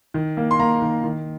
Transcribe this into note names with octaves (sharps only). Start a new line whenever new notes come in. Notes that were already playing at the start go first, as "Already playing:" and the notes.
D#3
A#3
C6
A#3 A#5
D#3
D#3